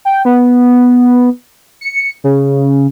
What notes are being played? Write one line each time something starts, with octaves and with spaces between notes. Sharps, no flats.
G5
B3
C#7
C#3